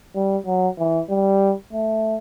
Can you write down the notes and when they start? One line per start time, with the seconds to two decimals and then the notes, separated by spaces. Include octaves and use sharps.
0.15 G3
0.46 F#3
0.78 E3
1.09 G3
1.73 A3